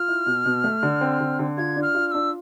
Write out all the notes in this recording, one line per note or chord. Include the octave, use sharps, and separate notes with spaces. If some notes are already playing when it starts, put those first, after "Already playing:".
Already playing: F4 F6
E4
B2
B2
A3
D3
C4
D3
D3
F4 G#6
D4
F6
F4
F6
D4 E6